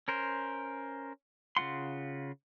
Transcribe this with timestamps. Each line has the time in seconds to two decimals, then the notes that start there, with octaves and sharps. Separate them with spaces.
0.08 C#4 A#4 C5
1.57 C#3 A#3 F4 F#5 C6